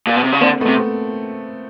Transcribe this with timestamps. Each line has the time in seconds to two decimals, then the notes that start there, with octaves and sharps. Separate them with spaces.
0.07 A#2
0.16 B2
0.24 C3
0.32 C#3
0.41 D3 A#3 C4
0.60 A3 B3
0.67 C3